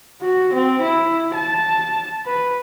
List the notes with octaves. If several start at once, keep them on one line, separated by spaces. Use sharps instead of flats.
F#4
C4
E4
A5
B4